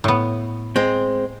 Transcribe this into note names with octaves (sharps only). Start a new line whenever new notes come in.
A2 B3
G#3 C4